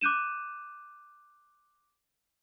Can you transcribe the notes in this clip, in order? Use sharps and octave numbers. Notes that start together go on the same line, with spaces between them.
D6 F#6 G6 D#7 E7